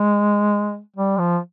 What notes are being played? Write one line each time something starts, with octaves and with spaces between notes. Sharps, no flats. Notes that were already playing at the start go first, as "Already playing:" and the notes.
Already playing: G#3
G3
F3